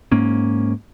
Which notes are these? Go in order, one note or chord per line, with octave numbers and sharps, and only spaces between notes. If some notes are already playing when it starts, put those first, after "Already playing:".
G#2 A#3 C#4